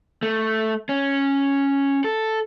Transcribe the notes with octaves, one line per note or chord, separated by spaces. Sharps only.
A3
C#4
A4